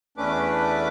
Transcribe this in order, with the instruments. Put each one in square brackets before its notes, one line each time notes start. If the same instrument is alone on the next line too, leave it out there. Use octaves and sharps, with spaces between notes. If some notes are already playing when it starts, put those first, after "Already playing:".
[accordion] E2 A3 C#4 D4 B4 D6